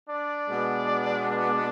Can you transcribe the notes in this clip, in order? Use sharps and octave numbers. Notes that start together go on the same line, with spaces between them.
D4 D5
B2 G#3 B3
D4 D5